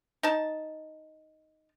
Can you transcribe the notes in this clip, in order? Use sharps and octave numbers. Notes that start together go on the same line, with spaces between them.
D#4 A5